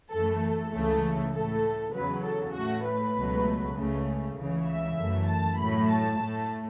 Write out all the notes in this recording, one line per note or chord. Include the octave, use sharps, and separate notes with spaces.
F#2 E3 A3 A4
A4
C#2 C#3 E3 A3
A2 A3 A4
E2 C#3 F#3 B4
A4
A2 A3 F#4
B4
C#2 B2 F#3 A3
C#2 C#3 A3
C#2 C#3 E3
E5
F#2 E3 A3
A5
A2 F#3 A3 B5
A5
A2 A3